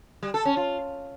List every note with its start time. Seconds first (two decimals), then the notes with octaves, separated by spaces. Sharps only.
0.23 G3
0.34 A4
0.45 C#4
0.57 F4